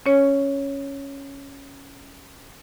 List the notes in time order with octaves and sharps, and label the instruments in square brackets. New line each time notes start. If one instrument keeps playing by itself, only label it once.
[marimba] C#4 C#5